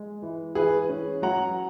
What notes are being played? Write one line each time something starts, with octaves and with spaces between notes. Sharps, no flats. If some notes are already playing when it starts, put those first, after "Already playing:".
Already playing: G#3
E3
E3 G#4 B4
C#4
F#3 F#5 A#5